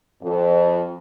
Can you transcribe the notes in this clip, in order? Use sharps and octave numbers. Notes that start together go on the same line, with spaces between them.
F2